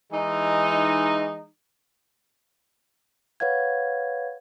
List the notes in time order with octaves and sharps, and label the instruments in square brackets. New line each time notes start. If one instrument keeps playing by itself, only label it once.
[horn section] E3 G#3 D#4
[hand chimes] B4 C#5 F5 F#5 G#6